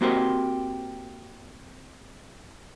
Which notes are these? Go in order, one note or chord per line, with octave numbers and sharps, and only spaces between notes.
A#3 C4 F#4 G4 A#4 C5